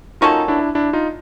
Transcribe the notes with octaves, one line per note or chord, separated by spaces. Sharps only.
A#3 C#4 D#4 F4 F#4 A4
D4 E4
D4 E4
D#4 F4